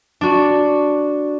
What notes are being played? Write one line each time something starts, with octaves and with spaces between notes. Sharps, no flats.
D4 F#4